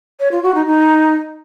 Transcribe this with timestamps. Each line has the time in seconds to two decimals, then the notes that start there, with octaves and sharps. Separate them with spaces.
0.19 C#5
0.31 F4
0.43 F#4
0.54 D#4
0.66 D#4